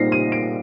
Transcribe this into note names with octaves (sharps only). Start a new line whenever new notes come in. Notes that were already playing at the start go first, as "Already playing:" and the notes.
Already playing: A#2 G3 C4 D#4 A#6 C7
D#7
D7